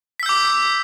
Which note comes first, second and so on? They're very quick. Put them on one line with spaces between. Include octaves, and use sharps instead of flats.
B6 E6 G6 D6